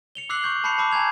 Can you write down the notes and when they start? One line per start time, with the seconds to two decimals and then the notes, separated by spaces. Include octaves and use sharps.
0.15 C#7 F7 G7
0.29 D6 E6 F#6 C7 F#7
0.44 C#6 G6
0.64 A5 B5 G6 C7 C#7 F7
0.78 A5 B5 D6 E6
0.92 G#5 A#5 G6 G#6 F7